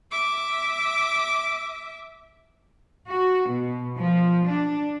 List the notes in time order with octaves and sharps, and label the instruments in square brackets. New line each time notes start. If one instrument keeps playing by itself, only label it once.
[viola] E5 D6
[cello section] F#4
B2
F3
D4